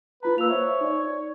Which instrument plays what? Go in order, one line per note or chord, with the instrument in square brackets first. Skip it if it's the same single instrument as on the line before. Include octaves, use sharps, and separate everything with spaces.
[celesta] E4 F4 A#5 [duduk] B4
[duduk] A#3 [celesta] E6 F7
[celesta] C5 E5 [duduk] C#5
[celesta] D#4 D5